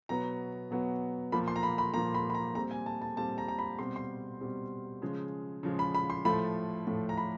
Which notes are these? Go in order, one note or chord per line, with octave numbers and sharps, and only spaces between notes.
B2 F#3 B3 A#5
B2 F#3 B3
A#2 F3 A#3 B5
C6
A#5
B5
B5
A#2 F3 A#3 A#5
B5
B5
A#5
A#2 G3 C4 A#5
G#5
A5
A5
A#2 G3 C4 A5
A#5
A#5
B5
B2 G3 C4 C6
C6
B2 G3 C4
C#3 F3 G#3
C#3 F3 G#3
B5
B5
C6
A2 F3 A3 B5
A2 F3 A3
A#5
B5